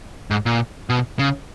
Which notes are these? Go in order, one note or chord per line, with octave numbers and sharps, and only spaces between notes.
G#2
A#2
B2
C#3